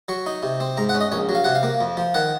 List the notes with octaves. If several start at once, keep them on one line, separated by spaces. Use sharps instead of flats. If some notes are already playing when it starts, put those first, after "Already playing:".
F#3 C#6
D#4
C3
C4
G#2 A#5
F#5
C#4
D#5
A#1 C#5
F#3
F5
C3 F#5
F5
A#3
F2
F3
D#3 F#5